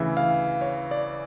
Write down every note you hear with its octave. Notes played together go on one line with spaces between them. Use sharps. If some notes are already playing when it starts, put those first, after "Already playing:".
Already playing: D2 C#3 E3 E5
F5
C#5
D5